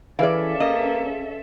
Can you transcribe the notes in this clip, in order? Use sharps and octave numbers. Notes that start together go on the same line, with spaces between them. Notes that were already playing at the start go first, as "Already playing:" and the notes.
E3 C#4 G#4 A4 B4 D5 E5 F5
A#3 D#5